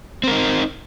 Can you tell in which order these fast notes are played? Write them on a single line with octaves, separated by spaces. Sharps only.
C4 A#4 D#4